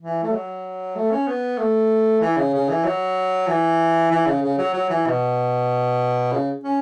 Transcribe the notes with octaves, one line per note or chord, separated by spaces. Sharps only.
E3
A3
F#3
A3
C#4
B3
A3
E3
C#3
C#3
E3
F#3
E3
E3
C#3
C#3
F#3
F#3
E3
B2
C#3
C#4